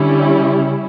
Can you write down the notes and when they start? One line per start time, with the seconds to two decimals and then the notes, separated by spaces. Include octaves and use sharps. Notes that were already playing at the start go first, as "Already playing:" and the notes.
Already playing: D3 G3 C#4 E4
0.40 C#3